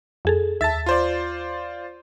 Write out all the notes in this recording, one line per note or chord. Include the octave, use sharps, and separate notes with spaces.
F2 G#4 A4
D#2 E5 A5 A6
F4 C5 D5